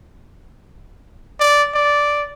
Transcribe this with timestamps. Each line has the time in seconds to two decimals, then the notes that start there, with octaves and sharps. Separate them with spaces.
1.40 D5
1.74 D5